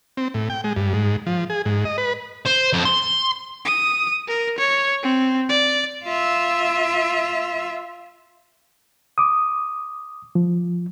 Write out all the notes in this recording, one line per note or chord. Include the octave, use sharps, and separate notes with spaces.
C4
A2
G5
G#3
G2
G#2
F3
G#4
G#2
D#5
B4
C5
F2
C6
D#6
A#4
C#5
C4
D5
F4 E5
D6 D#6
F3